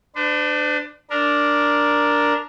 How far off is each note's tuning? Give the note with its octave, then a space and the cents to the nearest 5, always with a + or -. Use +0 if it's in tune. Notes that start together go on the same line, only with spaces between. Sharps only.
D4 +15 C5 -45
D4 -5 A#4 +5